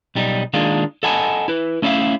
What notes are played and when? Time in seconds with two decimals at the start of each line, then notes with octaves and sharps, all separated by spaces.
0.15 B1 G3 D#4
0.54 D#3 G#3 A#3 D4 F4
1.03 A4 D#5 F#5 G#5 A5 B5
1.48 E4 B4
1.82 A3 C#4 E4 D5 E5 F5